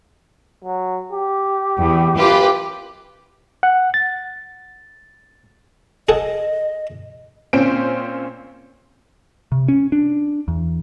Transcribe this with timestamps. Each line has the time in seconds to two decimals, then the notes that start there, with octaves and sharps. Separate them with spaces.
0.64 F#3
1.12 G4
1.79 E2
2.17 F#2 F4 G4 B4
3.63 F#5
3.94 A6
6.09 G#4 A4 D#5 F#5
7.53 A#2 C4 C#4 C5 D7
9.52 C3
9.68 C#4
9.92 D4
10.48 E2